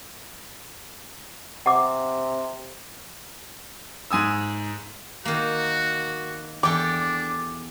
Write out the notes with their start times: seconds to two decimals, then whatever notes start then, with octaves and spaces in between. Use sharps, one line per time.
1.66 C3 F#5 D6
4.11 G#2 G#5 D#6 E6
5.25 D#3 A#3 F#4
6.63 E2 D4 G4 A4 D6